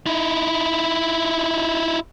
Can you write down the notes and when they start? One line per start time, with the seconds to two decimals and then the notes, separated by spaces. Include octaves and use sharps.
0.06 D#4 E4